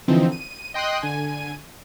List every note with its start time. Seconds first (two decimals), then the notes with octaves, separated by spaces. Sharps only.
0.08 D3 E3 F3 C4 D#4
0.32 D#7
0.74 D#5 G5 C6 D#6 F#6
1.02 D3 G#5 D#7